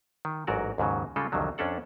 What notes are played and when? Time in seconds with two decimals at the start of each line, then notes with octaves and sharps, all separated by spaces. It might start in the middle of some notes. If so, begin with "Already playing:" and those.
0.25 D#3
0.47 A1 G#2 F#3 F#4 A#4 D5
0.78 D#2 G#2 C#3 F#3
1.16 C#3 G3 G#3 F4 A4
1.32 C2 F2 D3 D#3 F#3
1.58 F2 C#4 D4 A4 F#5